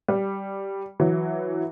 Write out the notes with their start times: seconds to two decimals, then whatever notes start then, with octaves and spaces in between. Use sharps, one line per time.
0.08 G3
1.00 E3 F#3